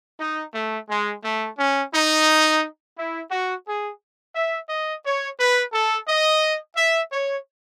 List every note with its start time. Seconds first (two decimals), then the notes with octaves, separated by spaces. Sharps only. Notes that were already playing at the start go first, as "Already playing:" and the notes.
0.19 D#4
0.54 A3
0.89 G#3
1.24 A3
1.58 C#4
1.93 D#4
2.97 E4
3.31 F#4
3.66 G#4
4.35 E5
4.70 D#5
5.04 C#5
5.38 B4
5.73 A4
6.08 D#5
6.76 E5
7.11 C#5